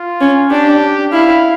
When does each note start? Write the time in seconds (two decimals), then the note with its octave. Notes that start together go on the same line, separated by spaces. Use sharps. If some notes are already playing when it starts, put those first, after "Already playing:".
Already playing: F4
0.21 C#4
0.50 D4 G4
1.12 E4 F5